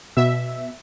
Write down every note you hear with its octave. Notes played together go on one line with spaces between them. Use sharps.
B2 E5